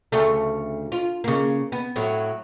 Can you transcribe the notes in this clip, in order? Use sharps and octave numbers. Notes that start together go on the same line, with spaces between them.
D2 C#3 A3
F4
C#3 A#3
B3
A2 F#3